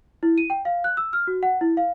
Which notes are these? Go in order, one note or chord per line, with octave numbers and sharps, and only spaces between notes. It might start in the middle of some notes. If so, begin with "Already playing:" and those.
E4
D#7
G5
F5
F#6
E6
F6
F#4
F#5
E4
F5